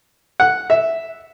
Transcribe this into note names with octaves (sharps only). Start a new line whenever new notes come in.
F#5
E5